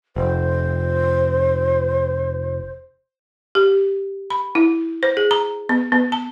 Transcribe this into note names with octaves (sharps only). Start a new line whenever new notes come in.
F1 C5
G4
B5
E4
C5
G#4
A#5
B3
B3
A5